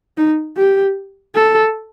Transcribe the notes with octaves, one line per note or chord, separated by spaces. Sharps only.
D#4
G4
A4